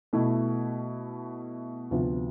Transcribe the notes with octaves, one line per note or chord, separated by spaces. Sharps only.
B2 A3 E4
D2 C3 F3 B3 F4